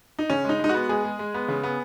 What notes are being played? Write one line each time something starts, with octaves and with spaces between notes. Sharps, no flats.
D#4
C#3 C#4
G#3 D#4
G#3 D#4
B3 F#4
G#3 G#4
G#3
G#3
B3
C#3
B3